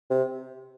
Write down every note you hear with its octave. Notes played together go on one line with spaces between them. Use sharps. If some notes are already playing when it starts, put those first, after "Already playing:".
C3